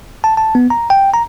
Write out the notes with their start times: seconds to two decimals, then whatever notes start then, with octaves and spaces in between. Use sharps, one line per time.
0.24 A5
0.37 A5
0.55 B3
0.70 A#5
0.90 G5
1.14 A#5